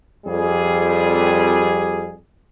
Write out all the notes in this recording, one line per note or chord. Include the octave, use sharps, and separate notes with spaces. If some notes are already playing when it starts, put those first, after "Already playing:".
F2 G3 G#4